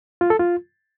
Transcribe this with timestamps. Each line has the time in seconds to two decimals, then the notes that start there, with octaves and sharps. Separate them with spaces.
0.21 F4
0.30 A4
0.40 F4